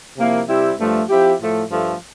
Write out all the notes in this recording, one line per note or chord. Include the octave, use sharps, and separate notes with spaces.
C3 F3 A#3 E4
C3 G3 C4 E4 G4
G2 F3 A3
F3 C4 E4 G4
A2 F3 A3
G2 F3 A3